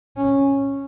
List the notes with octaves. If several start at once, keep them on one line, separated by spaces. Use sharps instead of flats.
C#4